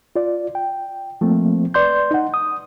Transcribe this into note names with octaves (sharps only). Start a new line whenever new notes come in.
F4 D5
G5
F3 A3 A#3 C4
B4 D5 C6 G6
D#4 F#5
D#6